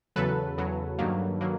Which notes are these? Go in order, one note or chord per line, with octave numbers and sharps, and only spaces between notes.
E2 C#3 F#3 A4 B4
E2 C#3 F#3
G2 D#3 F#3 A#3
D#3 F#3 A#3